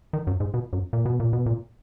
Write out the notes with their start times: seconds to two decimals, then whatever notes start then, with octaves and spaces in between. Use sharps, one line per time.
0.13 D#3
0.27 F#2
0.40 G#2
0.54 B2
0.73 F#2
0.93 A#2
1.06 B2
1.20 A#2
1.33 B2
1.46 A#2